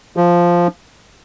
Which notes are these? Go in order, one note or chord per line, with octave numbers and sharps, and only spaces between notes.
F3